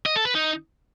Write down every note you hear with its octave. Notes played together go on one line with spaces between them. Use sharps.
D#5
A4
B4
D#4